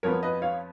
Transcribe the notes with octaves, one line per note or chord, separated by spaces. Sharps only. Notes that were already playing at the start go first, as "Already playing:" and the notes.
F2 F3 B3 A#4 C#5
B4 D#5
C#5 F5